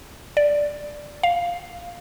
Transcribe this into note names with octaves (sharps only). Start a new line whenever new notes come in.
D5
F5